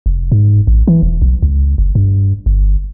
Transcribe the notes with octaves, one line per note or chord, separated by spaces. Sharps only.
F1
G#2
A1
E3
E1
B1
C#2
F#1
G2
G1